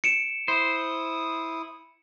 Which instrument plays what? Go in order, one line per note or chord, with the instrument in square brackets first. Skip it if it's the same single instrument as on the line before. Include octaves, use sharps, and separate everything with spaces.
[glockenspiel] C#7 D7 E7
[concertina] E4 D#6 [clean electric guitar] C5